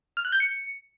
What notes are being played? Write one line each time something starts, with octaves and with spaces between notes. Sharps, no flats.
F6
F#6
G6
C#7